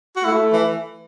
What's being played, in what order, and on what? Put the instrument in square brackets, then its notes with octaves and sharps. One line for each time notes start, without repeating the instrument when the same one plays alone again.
[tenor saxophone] F#4
[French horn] A3 [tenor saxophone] E4
[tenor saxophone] E3